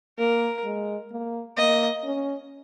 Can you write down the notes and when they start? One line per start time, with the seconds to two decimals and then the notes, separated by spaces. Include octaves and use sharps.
0.19 A#3 A#4
0.65 G#3
1.12 A#3
1.57 A#3 D#5
2.04 C#4